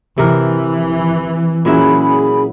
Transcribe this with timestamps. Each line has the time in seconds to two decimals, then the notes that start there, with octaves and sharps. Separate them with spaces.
0.18 C3 E3 A#4
1.65 A#2 F#3 C#4 E4 G#4 B5